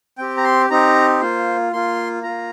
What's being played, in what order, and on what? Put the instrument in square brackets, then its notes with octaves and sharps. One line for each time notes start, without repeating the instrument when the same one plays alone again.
[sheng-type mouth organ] C4 G4 G5
A#5
C6
C4 D#4 G4 A#5
A#3 F4 C5
A#3 F4 C6
A#3 F4 A#5